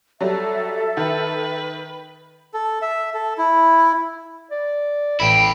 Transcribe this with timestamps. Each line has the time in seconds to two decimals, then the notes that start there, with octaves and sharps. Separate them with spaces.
0.21 F#3 G3 A4 E5
0.97 D#3 B4
2.54 A4
2.82 E5
3.14 A4
3.38 E4
4.51 D5
5.20 A1 E4 G5 B5